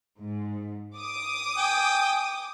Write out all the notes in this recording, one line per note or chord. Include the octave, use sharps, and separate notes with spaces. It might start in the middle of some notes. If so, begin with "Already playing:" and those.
G#2
D6 D#6
G5 G#5